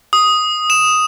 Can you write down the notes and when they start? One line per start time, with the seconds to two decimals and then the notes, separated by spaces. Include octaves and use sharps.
0.13 D#6
0.70 E7